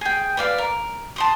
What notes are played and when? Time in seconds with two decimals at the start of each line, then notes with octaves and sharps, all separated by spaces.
0.01 G#4 G5
0.37 B4 D5 F5
0.58 A#4
1.16 A5 C6 D#6